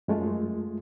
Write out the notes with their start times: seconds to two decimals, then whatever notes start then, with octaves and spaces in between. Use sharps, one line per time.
0.08 F#2 G#3 A3 F4